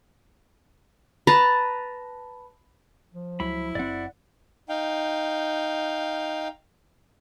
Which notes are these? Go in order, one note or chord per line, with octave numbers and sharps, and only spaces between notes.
B4 A5 A#5
F3
C#2 F#3 E4 B5
F#1 C4 D5 F#5
D#4 F5 G5